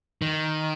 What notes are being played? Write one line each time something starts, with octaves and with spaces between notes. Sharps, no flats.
D#3